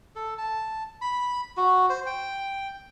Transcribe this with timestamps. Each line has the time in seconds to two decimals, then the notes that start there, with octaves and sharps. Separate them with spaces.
0.16 A4
0.38 A5
1.01 B5
1.57 F#4
1.90 C5
2.06 G5